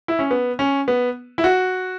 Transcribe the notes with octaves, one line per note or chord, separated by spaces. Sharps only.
E4
C#4
B3
C#4
B3
E4
F#4